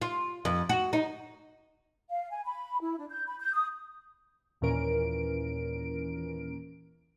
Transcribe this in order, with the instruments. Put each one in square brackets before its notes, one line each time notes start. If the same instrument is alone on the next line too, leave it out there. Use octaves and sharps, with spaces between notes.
[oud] F4
F2
F#4
D#4
[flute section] F5
G#5
B5
E4
D4
G6
B5
G6
D#6
[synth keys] D#2 A#2 E3 C#4 A#4 D7